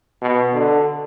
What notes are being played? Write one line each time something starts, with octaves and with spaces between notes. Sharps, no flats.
B2
D3